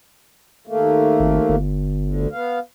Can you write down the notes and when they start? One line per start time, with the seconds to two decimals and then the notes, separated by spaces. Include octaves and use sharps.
0.67 D#2 A3 A#3
1.20 G#1
1.49 G1
2.05 D2 D3
2.32 B3 F5